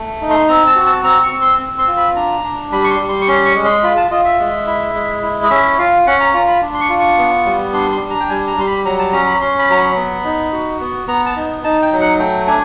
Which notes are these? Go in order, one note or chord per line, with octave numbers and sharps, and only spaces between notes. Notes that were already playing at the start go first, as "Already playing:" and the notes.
Already playing: A3
D#4
C6
C4 A#5
A5
F#4
A5
C4 A#5
C#6
C4
C6
C4
C6
F4
B5
D4 A#5
D4
G3 B5
C#6
C6
G3
C6
C#6
C#4 C6
C#6
G#3
C6
F4 B5
A5
F4 D#5
E5
G#3
E4
G#3
E4
D#5
C#4 E5
F4 F5
C#4 F#5
A#5
F4 A#5
B5
D4
C6
C#6
F4
C#6
B3
G3
D4 C6
C6
D4
A#5
G5
G3 G#5
A#5
G3 C6
B5
F#3 A#5
A5
C#4 A#5
B5
C#4 C6
B5
F#3 A#5
B5
B3
D#4
F#4
B3
B3 A#5
A5
D#4
D#4 A5
G5
F#3
F#5
A3 G5
D4 G#5